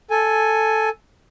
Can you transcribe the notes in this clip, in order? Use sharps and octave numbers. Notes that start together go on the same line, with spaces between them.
A4 G#5